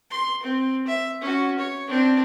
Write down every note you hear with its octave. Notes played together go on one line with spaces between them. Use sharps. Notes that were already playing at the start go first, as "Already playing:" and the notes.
C6
C4
E5
C#4 F#4
C#5
C4 D4